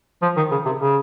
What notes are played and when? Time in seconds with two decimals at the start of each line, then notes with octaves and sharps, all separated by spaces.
0.22 F3
0.36 D#3
0.51 C#3
0.65 C3
0.79 C#3